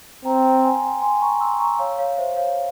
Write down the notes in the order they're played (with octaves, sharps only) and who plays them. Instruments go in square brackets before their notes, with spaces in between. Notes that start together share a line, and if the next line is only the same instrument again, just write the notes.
[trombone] C4 [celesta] G5 A#5
[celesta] G#5 C6
G#5 C6
A#5 C#6
C6 E6
A#5 C#6
C#5 F5
C#5 F5
C5 E5
C#5 F5